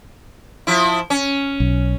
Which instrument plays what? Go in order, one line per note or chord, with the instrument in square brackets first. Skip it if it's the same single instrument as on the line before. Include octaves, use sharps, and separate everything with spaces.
[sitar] F3 E4
C#4
[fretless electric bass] B1